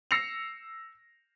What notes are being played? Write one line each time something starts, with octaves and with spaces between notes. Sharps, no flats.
E6 A#6 C7 C#7 F7